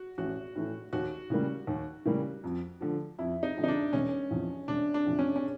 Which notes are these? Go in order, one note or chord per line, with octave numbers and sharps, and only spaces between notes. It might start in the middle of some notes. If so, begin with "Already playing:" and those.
Already playing: F#4
A1 F#4
A2 E3 A3
D#2 F#4
C#3 E3 G3 A#3
D#2
C#3 E3 G3 A#3
F2
D3 F3
F2 E4
D#4
D3 F3
D#4
D4
E1 C#4
E2 C3 F3
E1 D4
D4
E2 C3 F3
C#4
C#4